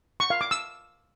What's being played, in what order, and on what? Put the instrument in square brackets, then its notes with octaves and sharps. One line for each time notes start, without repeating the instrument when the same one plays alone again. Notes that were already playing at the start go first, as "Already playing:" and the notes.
[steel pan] C#6
F5
D6
E6